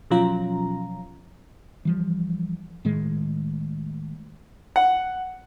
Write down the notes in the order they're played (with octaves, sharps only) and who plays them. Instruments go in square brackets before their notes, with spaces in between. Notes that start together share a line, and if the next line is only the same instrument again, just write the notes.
[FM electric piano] B2 F3 F#3 C#4 F4 A#5
[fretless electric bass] E3 F3 G3
A2 D#3 G#3
[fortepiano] F#5